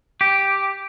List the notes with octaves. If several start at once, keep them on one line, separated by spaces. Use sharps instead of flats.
G4